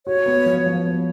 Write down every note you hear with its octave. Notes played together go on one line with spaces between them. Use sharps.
F#4 C#5
B3
F3
F3
B3